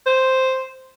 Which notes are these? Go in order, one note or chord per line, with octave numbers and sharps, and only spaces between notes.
C5